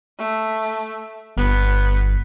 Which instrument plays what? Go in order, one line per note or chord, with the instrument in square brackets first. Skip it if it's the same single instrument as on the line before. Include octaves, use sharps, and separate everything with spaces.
[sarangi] A3
[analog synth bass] G1 [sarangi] B3